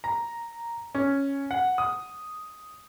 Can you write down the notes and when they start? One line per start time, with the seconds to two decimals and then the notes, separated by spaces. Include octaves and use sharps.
0.04 A#5
0.95 C#4
1.51 F#5
1.78 D#6